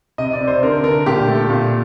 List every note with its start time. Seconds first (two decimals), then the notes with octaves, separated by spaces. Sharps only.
0.18 C3 D#5
0.33 D5
0.41 C3
0.47 C5
0.62 D3 A#4
0.84 D3 A#4
1.06 A#2 G4
1.28 A3
1.50 A#2